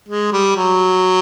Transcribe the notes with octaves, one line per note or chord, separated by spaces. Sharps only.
G#3
G3
F#3